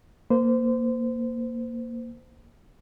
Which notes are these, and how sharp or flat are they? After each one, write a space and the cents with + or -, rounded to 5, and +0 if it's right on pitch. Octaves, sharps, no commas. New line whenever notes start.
A#3 +0 C5 -25